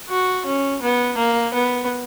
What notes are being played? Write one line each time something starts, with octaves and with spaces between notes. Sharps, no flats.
F#4
C#4
B3
A#3
B3